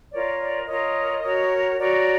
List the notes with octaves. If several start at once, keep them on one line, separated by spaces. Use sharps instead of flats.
F4 A#4 C#5 D5
D5
F4 A#4 C#5 D#5
F#4 A#4 C#5
F#4 A#4 C#5 D5